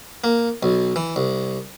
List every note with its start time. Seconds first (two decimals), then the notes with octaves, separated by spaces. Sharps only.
0.24 A#3
0.63 B1
0.96 E3
1.16 C2